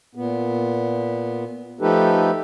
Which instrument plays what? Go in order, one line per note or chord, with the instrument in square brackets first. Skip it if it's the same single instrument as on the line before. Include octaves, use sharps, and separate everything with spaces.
[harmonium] A#2 B3
F3 A3 D#4 G4 A4 B4